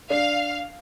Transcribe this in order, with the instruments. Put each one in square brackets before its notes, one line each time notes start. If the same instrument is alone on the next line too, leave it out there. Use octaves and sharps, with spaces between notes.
[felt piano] D4 [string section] F5